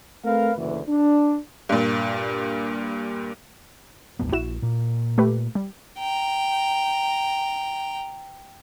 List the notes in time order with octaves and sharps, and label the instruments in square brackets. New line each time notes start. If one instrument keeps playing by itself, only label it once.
[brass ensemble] A3 C4 A#4 B4 F5
F#1 D2 E3
D4
[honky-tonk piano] G2 A#2
[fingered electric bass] D#1 A1 B3
[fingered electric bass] A#1 [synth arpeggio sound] E4 F#4 E7
[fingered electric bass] A#2
[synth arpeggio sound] A3 G4 B4
G3
[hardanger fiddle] G5 A#5